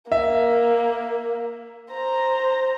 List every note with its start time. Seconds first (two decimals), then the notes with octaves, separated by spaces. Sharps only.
0.12 A#3 E5
1.93 C5 A#5